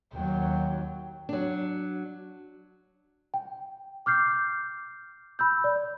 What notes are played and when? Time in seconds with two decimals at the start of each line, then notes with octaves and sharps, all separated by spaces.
0.14 D#2 F#3 G5
1.29 F#3 D4
3.34 G5
4.06 D6 F6 G6 C7
5.39 B5 E6 G6
5.64 D5